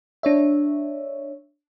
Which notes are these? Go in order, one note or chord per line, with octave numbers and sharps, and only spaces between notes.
D4 C#5 E5